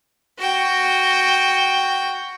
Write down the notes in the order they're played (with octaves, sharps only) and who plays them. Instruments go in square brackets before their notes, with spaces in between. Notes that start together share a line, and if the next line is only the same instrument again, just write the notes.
[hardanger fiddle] F#4 G5